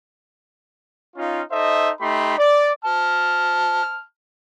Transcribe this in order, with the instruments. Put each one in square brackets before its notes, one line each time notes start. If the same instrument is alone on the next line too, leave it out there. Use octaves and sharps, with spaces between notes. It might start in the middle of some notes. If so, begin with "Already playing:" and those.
[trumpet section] C#4 D#4 F4
D#4 A4 C5 D#5 E5
A3 D#4 G4 B5 C6
D5
[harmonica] A5 F6